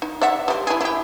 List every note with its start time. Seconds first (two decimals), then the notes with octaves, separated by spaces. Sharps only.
0.02 D#4
0.21 D5 E5 F#5
0.48 G3 C4
0.67 E4 G#4
0.81 E4 G4